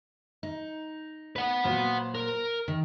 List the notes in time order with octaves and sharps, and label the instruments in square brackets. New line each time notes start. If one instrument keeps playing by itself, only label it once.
[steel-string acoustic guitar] D#4
[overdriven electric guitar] B4 F#5
[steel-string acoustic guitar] A#2 F#3 C5
[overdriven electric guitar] A#4
[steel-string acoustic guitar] D#3